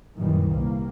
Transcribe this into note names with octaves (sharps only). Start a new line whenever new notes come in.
F#2 A#2 D#3 E3 G3
C2 A#3